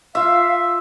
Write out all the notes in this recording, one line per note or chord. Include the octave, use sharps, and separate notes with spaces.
F4 E5 F5